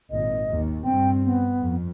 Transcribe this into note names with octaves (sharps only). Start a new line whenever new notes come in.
G#1 A#2 D#5
D#2
G2 C4 G5
B3
F2